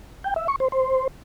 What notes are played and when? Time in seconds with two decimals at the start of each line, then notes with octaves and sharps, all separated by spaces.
0.24 G5
0.36 E5
0.48 C#6
0.60 C5
0.72 C5